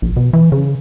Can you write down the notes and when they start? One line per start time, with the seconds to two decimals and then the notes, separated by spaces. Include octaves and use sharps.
0.02 A#1
0.17 B2
0.33 E3
0.52 C#3